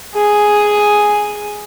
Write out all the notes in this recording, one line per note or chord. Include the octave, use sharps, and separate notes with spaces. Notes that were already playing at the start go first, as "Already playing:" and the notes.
G#4 G#5